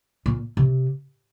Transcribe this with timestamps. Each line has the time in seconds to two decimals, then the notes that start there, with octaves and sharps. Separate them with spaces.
0.26 A#2
0.57 C3